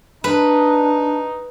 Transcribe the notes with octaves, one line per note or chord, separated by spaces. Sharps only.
D4 D#4 B4